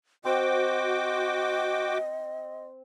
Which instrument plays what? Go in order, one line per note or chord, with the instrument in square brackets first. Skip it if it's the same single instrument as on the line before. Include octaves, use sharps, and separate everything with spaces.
[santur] C4 C5 [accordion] F#4 G5 D6 [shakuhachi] D#5